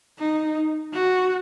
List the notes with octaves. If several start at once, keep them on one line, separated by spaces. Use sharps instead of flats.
D#4
F#4